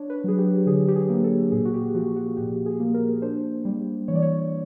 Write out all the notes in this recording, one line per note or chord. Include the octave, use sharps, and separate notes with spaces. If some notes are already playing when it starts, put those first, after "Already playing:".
Already playing: D4 C#5
B4
F#3 G#4
G4
D3 G#4
G4
G#4
A#3
A4
A#2 G#4
F#4
G4
F3 F#4
F#4
A#2 G4
G#4
A#3
A#4
D4 C5
G3
E3 C#5
D5
C#5